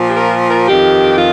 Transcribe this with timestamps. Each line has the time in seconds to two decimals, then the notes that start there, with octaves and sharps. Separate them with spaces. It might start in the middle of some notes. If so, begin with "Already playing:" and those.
Already playing: A#2 F3
0.08 G4
0.17 A#4
0.51 A#4
0.67 F2 D#3 G4
1.18 F4